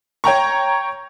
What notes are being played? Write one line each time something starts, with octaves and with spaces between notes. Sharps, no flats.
C#5 G5 A#5 C#6